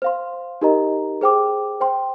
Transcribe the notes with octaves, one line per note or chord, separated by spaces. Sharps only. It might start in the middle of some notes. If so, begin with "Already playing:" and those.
C5 F5 C6
D#4 G4 A#4 D#5 A#5
G#4 C5 G5 D6
C5 G5 C6